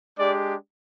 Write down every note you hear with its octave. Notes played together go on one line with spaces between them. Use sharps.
G#3 D4 G4 D5